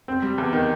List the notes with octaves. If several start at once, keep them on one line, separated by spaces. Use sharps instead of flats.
C4
G3
E2
D#3